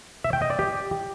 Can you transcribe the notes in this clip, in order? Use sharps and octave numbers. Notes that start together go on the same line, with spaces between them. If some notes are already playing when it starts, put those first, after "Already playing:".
E5
G5
D#5
D5
G4